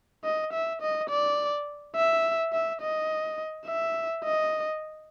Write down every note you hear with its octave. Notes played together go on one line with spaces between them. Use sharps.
D#5
E5
D#5
D5
E5
E5
D#5
E5
D#5